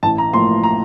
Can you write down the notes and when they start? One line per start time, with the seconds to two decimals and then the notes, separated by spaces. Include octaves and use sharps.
0.03 A1 A5
0.18 A#5
0.33 A2 F3 A#3 C6
0.64 A#5